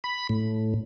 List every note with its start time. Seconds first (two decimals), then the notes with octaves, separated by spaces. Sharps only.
0.04 B5
0.29 A2